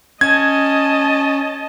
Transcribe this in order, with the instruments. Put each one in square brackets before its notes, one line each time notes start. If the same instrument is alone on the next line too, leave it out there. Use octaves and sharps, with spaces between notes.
[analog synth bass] C#4 [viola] D#5 A5 [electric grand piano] G#6